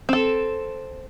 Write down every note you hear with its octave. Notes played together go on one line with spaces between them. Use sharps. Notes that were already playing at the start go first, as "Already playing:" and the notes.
C4 A4